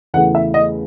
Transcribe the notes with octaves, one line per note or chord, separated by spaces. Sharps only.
E2 C#3 E3 A3 F#5
E5
D#5